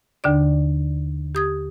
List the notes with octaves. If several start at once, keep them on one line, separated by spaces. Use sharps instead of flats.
D#2 D3 D4 D5
G4 D#6 G#6